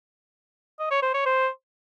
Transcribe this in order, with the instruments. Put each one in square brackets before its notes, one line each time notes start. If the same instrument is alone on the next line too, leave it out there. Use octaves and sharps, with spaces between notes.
[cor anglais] D#5
C#5
C5
C#5
C5